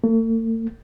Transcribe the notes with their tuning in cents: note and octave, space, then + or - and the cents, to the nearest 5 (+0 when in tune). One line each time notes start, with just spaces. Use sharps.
A3 +45